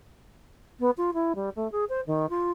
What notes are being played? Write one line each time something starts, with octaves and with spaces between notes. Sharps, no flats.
B3
F4
E4
G3
A3
G#4
C5
D#3
F4